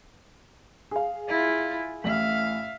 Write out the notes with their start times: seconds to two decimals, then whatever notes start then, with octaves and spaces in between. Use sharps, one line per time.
0.91 G#4 F5
1.28 E4 F4
2.04 A1 A2 E5 F5 F#7